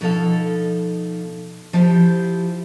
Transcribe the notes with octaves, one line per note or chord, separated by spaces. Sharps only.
B2 F3 D#4 A4 D#5 F5
F3 E4 F4 G4 C5